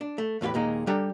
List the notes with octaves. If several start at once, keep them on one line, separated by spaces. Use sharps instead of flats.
D4
A3
E2 A2 F4 G4 B4
D#2 A#2 G#3 D#4
G3 D4 G4 A4 A#5